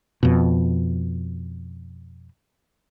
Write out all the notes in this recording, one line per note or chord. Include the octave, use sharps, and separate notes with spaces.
F2 B2